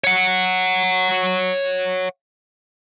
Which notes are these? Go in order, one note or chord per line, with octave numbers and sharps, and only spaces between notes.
C#5 F#5